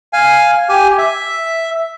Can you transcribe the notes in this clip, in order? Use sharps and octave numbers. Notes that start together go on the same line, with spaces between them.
F5 G#5
G4 G#5
E5